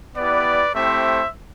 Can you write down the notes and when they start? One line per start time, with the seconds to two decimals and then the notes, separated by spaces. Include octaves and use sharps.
0.16 B3 E4 G4 B4 D5
0.75 A3 C4 E4 G4 C5 E5